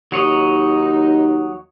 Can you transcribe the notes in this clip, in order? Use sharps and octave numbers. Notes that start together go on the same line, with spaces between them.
D#2 F#3 D#4 C#5 D#5